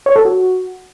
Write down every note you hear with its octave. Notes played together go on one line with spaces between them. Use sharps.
C#5
A4
F#4